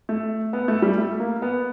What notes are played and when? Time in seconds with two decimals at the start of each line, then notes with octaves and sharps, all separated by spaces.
0.09 A3
0.53 B3
0.68 A3
0.82 G3
0.98 A3
1.20 A#3
1.42 B3